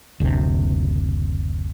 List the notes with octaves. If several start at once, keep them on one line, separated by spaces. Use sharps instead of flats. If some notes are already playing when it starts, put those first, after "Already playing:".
F#1 D2 C3